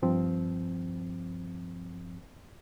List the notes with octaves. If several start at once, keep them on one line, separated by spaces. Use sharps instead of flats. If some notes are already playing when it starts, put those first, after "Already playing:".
G2 F3 C4